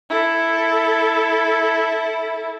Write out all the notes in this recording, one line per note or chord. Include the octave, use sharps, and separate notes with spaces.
E4 A4